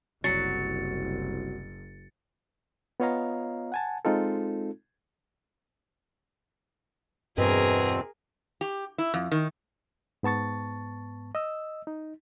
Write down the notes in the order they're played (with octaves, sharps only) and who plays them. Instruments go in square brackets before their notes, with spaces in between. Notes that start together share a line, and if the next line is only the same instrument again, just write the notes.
[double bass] F#1 [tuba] C2 [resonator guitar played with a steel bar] F#3 [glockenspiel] A6 C#7
[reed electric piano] B3 F4 C#5 D#5 F5 A#5
F#5 G#5 A5
G#3 C4 D#4 F4 A4
[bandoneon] E2 B2 C4 [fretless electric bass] G2 [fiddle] G#4 A#4 [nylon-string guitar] B4 D#5
[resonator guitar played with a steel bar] G4
E4
F2
D#3
[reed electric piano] G#2 B3 A5 C#6 A6
D#5 E6
D#4